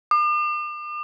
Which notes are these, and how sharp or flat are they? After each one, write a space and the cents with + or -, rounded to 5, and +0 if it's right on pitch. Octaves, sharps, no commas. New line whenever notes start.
D6 +45